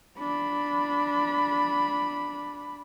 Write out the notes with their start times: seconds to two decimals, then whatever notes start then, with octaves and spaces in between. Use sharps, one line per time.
0.19 D4 B5